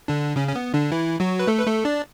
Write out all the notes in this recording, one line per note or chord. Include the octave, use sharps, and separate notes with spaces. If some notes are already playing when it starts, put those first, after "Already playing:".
D3 D4
C#3 C#4
C#4
B3
D3 D4
E3 E4
F#3 F#4
B4
A3 A4
B4
A3 A4
D4 D5